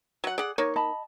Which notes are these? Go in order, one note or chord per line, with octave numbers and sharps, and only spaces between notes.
F#3 F#5
G#4 D5 F#5
A#3 D#4 C#5
D#5 A5 B5